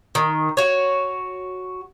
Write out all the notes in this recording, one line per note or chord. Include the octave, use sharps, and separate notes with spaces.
D#3
F#4 C#5